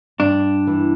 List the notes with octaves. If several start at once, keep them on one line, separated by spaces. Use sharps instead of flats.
G2 D4
E3